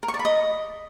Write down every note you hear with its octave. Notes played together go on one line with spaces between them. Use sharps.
A#4
C#6
D5
B5
D#5